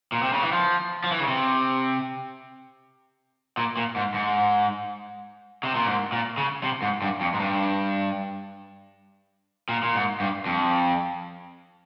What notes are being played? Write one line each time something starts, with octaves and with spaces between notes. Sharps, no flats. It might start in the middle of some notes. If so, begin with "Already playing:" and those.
A#2
C3
C#3
E3
F3
F3
E3
C#3
C3
A#2
A#2
G#2
G#2
C3
A#2
G#2
A#2
C#3
C3
G#2
G2
F2
G#2
G2
A#2
A#2
G#2
G2
F2